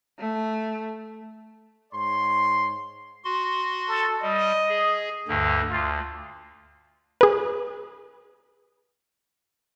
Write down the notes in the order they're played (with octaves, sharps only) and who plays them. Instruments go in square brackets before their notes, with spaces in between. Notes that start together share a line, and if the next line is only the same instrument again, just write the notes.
[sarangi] A3
[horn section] G#2 C#5 C6
[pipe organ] F#4 C6
[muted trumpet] A4
[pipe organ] G3 [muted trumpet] D#5
[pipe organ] G#4
D2 G2 D3
[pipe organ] D2 [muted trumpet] F4
[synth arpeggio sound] G#4 B4